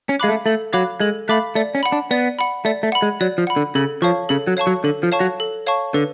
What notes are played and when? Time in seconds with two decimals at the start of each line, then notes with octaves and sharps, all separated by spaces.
0.09 C#4
0.19 G#3 F5 B5 D6 F#6
0.29 A3
0.46 A3 A4
0.73 F#3 F5 B5 D6 F#6
1.00 G#3 A4
1.28 A3 F5 B5 D6 F#6
1.55 A3 D5
1.75 C#4
1.83 F#5 B5
1.92 D4
2.11 B3 D5
2.39 F#5 B5
2.65 A3 D5
2.83 A3
2.92 F#5 B5
3.02 G#3
3.21 F#3 D5
3.38 F3
3.47 F#5 B5
3.56 D3
3.75 C#3 A4
4.02 F3 C#5 F5 A5 C#6
4.29 C#3 A4
4.47 F#3
4.57 C#5 F5 A5 C#6
4.67 F#3
4.84 D3 A4
5.03 F3
5.12 C#5 F5 A5 C#6
5.20 F#3
5.40 A4
5.67 C#5 F5 A5 C#6
5.94 D3 B4